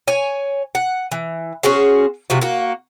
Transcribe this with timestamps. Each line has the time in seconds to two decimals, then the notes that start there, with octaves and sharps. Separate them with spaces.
0.08 C#5 G#5
0.75 F#5
1.12 E3
1.63 C#4 F#4 G#4 C5
2.30 C3 F3 F#4
2.42 A#3 F#4